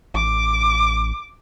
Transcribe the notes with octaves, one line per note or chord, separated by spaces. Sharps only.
A1 D6